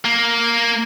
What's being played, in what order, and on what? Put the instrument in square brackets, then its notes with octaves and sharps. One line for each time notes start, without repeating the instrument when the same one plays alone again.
[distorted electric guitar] A#3